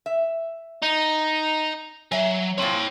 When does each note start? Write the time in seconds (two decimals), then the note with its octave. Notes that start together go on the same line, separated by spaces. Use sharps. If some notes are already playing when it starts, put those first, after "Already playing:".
0.06 E5
0.82 D#4
2.12 F#3 E5 G#5
2.58 A#2 C4 C#5 G5